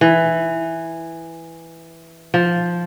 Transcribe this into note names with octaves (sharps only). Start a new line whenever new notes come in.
E3
F3